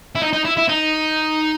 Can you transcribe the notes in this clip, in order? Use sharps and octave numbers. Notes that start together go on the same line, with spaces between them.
E4
D#4
D#4
E4
E4
D#4